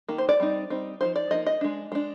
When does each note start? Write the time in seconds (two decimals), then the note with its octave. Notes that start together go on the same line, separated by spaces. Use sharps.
0.09 D#3 A#3 D#4
0.18 C5
0.29 D5
0.40 G3 C4 D#4
0.70 G3 C4 D#4
1.01 F3 A#3 D#4 C5
1.16 D5
1.31 F3 A#3 D#4 D#5
1.46 D#5
1.61 G#3 D4
1.92 G#3 D4